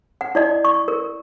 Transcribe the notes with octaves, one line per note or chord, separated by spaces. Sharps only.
F#5
E4 D5 D#5
C#6
A#4